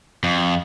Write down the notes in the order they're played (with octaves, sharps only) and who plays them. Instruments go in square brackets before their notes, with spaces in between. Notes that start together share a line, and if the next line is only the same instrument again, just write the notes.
[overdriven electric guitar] F2